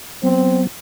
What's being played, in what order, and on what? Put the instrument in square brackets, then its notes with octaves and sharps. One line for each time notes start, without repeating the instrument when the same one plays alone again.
[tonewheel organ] F#3 B3 [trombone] C4